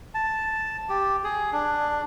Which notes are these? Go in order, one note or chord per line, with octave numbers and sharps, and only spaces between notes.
A5
G4
G#4
D4